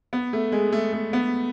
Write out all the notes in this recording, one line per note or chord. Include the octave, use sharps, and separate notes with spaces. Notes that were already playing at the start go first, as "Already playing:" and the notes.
B3
A3
G#3
A3
A3
B3